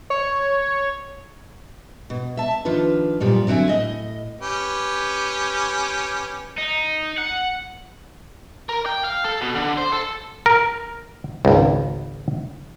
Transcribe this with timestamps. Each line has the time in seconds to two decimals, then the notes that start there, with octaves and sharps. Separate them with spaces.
0.10 C#5
2.10 B2
2.37 E5 A5
2.65 D#3 F3 D4 F4 B4
3.20 F#2 A#2 F3 G3
3.47 D3 F#3 C4 E5 G#5
3.68 A2 D#5
4.41 C#4 G4 B4
6.58 D#4
7.18 F#5
8.69 A#4
8.86 G5
9.04 F5
9.24 A4
9.41 B2
9.55 D3
9.77 C5
9.92 A4
10.46 A#4
11.45 G#1 C#2